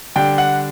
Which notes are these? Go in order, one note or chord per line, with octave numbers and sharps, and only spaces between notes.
D3 G3 D4 G5
F#5